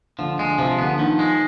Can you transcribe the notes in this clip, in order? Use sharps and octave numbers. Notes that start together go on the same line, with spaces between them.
D3 F3
D3 G#3
C3 F3
D3 B3
D#3 F3
G#3